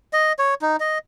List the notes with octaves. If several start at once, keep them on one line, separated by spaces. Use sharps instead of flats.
D#5
C#5
D#4
D#5